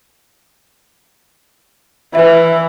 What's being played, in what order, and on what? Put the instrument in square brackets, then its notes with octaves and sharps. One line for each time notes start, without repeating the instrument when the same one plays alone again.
[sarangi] E3 [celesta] B4 E5